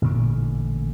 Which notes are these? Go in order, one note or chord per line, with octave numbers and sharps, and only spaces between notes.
A1 A#2 D3 D4